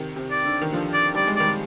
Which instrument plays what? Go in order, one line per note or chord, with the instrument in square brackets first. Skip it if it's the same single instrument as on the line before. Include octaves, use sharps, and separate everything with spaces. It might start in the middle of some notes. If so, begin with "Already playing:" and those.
Already playing: [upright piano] C3 D#3
C3
[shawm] D5
[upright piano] D3
D#3
D3 F3
[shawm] D5
[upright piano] G3 [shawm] D5
[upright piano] G#3
[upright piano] D#3 G3 [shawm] D5